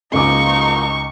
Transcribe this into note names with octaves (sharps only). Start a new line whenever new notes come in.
C#2 G#2 F3 A#3 D#4 F4 C#6 D6